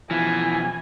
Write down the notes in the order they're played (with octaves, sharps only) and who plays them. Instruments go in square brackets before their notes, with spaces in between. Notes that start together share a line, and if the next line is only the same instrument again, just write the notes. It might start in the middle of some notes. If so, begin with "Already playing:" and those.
[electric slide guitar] B2 F3 [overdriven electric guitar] E3 [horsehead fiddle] G#5